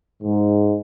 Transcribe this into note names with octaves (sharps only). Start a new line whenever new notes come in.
G#2